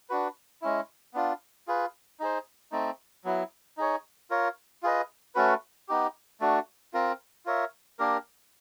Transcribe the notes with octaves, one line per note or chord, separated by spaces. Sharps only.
D4 F#4 B4
G#3 C#4 E4
B3 D4 F4
F4 G#4 B4
D#4 G#4 C5
A3 C4 D#4
F#3 B3 E4
D#4 G#4 C#5
F4 A#4 C#5
F4 G#4 B4 D#5
A3 C#4 F#4 B4
B3 D#4 G4
A3 D4 F#4
C4 F4 A#4
F4 A#4 C#5 E5
A#3 D4 G4 A#4